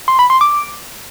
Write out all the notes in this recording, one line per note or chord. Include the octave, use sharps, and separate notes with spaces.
C6
B5
C6
D6